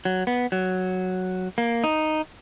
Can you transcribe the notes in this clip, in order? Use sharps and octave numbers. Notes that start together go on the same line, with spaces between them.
F#3
B3
F#3
A#3
D#4